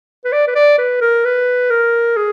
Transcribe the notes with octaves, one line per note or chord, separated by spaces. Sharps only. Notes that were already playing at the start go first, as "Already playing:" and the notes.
B4
D5
B4
D5
B4
A#4
B4
A#4
G#4